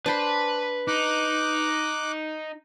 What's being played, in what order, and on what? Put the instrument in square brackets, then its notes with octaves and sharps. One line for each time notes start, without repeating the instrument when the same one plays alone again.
[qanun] D4 C5 C6 [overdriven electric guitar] B4 B5
[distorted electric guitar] D#4 [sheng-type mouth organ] D6 F#6